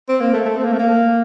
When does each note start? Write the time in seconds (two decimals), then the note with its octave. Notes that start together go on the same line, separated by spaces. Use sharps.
0.09 C4
0.20 A#3
0.34 A3
0.45 A3
0.57 C4
0.64 A#3
0.73 A3
0.79 A#3